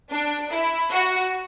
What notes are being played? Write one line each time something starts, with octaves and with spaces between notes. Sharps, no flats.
D4
E4
F#4